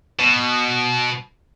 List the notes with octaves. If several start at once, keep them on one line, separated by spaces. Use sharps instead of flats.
B2